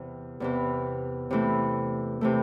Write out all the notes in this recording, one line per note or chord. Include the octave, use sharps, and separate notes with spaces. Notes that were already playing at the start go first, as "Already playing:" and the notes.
Already playing: E2 C3 E3
E2 C3 E3
C3 E3 A3
C3 E3 A3